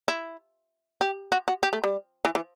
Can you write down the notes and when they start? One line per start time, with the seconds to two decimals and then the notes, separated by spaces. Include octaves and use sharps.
0.08 E4
1.01 G4
1.32 F#4
1.48 F#4
1.63 G4
1.73 A3
1.84 G3
2.25 E3
2.35 E3